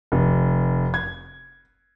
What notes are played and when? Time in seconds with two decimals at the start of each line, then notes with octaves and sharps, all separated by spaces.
0.12 F1
0.94 G#6